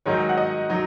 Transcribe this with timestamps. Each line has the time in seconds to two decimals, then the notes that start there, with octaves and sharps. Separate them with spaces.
0.06 G#2 D#3 F#3 D#4 C#5
0.29 F#5
0.37 D#5
0.70 F#3 D#4